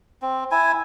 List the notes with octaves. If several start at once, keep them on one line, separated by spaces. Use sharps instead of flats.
C4
E4 G#5